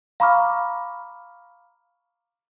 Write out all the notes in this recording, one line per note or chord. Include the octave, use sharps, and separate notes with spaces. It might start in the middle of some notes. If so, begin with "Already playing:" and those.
F5 A#5 B5 C#6 D6 F6